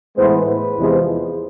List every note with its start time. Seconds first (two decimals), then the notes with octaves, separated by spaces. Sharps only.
0.16 A2 E3 G#3 B3 C5
0.45 B4
0.76 E2 C3 F3 G#3